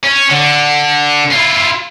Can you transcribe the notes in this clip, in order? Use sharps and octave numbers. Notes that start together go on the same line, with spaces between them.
C#4
D3
E4 F4